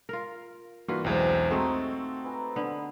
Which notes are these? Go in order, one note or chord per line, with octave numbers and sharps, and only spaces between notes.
F4 A#4
G2 E3 A#3 F4 F#4 B4
B1 E2 G#3 C4 E5 F5
G#3 A3 C4 D#4 F#4 G#4 A4
B4 G#5 A#5
D3 B3